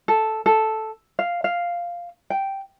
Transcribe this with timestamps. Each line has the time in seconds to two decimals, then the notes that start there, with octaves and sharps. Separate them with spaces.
0.08 A4
0.46 A4
1.19 F5
1.44 F5
2.30 G5